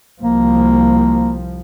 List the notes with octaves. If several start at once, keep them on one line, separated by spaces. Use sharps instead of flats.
C2 F3 A#3